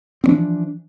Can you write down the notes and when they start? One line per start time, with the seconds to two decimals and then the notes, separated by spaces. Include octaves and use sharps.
0.24 C4
0.26 F3
0.29 D4
0.31 E3